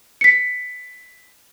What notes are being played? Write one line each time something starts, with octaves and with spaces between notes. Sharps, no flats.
B6 C#7